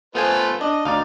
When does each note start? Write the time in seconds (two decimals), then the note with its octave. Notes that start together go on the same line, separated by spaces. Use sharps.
0.15 A3 B3 F4 B4 C5 G#5
0.61 D4 D#5
0.85 D2 D#4 D5 F5